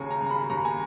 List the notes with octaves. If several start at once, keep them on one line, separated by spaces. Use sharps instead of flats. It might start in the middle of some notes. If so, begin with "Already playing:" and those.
Already playing: D#2 C#3 G#5 A#5
A#5
C#3
B5
D#2 A#5
G#5